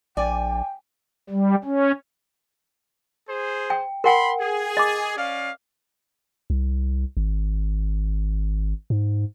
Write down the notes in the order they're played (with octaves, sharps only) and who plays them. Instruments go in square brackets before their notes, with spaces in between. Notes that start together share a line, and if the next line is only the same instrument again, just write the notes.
[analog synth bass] A#1 [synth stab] D5 [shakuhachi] G5 [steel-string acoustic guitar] G#5
[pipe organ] G3
C#4
[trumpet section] G#4 C5
[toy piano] G5
[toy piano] A#4 F#5 G5 [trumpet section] B5 C6
[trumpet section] G#4
[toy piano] D#5 D6
[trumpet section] C#4 D5 F5
[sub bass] C2
G#1
G#2